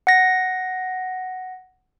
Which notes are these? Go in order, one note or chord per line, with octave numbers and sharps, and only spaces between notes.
F#5 A#6